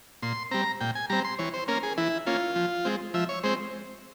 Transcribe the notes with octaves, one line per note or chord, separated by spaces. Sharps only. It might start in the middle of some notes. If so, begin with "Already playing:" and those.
A#2 C6
G3 C4 A#5
A#2 G5
G#5
G3 C4 A#5
C6
E3 C#5
C5
A#3 C#4 A#4
G#4
E3 E4
A#3 C#4 F4
F3
G#3 C4
F3 E5
C#5
G#3 C4 C5